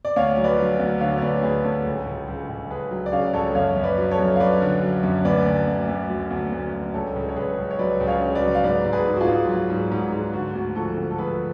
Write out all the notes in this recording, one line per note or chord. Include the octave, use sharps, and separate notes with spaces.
D5
D2 C#5 F5
F#3
B4 D5
F#3
D2
D3 C#5 F5
C#5
D2 B4 D5
D2 G#4 B4
D2 A4 C#5
C#2
C#2
C#2
C#2
C#2 G#4 B4
F#3
D5
C#3 C#5 F5
C#2 A4 C#5
F#2 C#5 F5
F#2
B4 D5
F#3
A4 C#5
F#2
F5
F#3 B4 D5
D3
F#3
F#2
D2 B4 D5
D3
D2
D2
F#3
D2
D2
D2
C#2 A4 C#5
C#2
C#5
C#2 G#4 B4
C#2
C#5
F#3 B4 D5
C#2
C#5 F5
C#3
B4 D5
F#3
F5
G#2 B4 D5
G#2
G#4 B4
G#2
F#4
F4 G#4
G#2
F#3
G#2
G#2
G#2
D3 F#4
D2 F#4
F3 F#4 A4
D2
A4
F3 G#4 B4